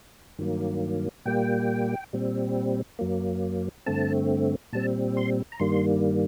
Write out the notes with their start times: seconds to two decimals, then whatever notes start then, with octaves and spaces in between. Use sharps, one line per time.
0.39 G2 D#3 F#3 A#3
1.25 A#2 G3 A#3 G5
2.13 A#2 G3 C4
2.99 F#2 F#3 A#3
3.86 G2 D3 A3 C4 A5
4.73 A#2 G3 C4 A5
5.17 C6
5.52 A#5
5.60 G2 D#3 G3 A#3 C6